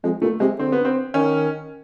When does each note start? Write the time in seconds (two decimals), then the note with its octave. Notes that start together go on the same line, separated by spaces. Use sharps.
0.04 F2 G#3
0.22 A#2 A3
0.40 C3 G#3
0.59 D3 C4
0.72 B3
0.85 C4
1.14 D#3 C#4